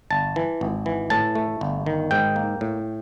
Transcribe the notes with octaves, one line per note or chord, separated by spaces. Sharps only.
G1 A5
E3
G#1
E3
A2 A5
A3
G1
D#3
G#2 G5
A#3
A2